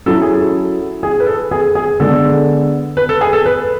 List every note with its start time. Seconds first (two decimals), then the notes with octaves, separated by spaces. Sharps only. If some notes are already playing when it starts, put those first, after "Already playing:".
0.06 F#3 C#4 E4 A4
0.21 G#4
0.38 A4
1.03 G#4
1.20 B4
1.26 A4
1.51 G#4
1.75 G#4
2.00 D3 G#3 B3 D4 A4
2.97 B4
3.09 A4
3.21 G#4
3.33 A4
3.46 B4